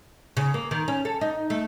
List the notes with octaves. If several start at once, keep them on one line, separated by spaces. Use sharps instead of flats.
C#3
A#3
D#3
C#4
A4
D#4
A3